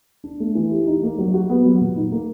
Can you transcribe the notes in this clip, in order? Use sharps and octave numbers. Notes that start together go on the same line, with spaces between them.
D4
A3
E3
G4
D#4
A#3
F#3
F#4
B3
F#3
A#2
D#4
A#3